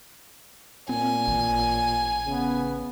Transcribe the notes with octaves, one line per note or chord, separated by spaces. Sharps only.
A#2 C4 G#5
A1
C#3 B3